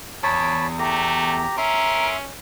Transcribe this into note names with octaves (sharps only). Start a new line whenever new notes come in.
E2 C#5 A5 B5
A3 G4 A#5
C#4 A#4 E5 C6